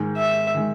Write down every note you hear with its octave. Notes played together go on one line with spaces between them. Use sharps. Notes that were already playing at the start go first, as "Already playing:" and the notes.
Already playing: G#2 D#3 G#3
E5
D#3 G#3